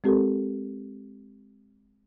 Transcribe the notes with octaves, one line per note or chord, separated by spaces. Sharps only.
G#3 C4 G4 A4 A#4